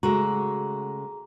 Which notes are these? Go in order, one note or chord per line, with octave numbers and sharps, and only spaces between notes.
C#3 G#3 A3 F#4 G#4 A#5